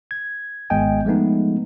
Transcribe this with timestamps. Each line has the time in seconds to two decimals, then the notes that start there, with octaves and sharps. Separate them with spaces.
0.11 G#6
0.70 G#1 G#3 B3 D#5 G5 G#5
1.05 F3 G#3 A3 B3 D#4